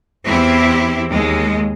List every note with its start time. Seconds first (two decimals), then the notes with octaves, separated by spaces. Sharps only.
0.24 E2 C4 E4 G4
1.09 D#2 G#3 D#5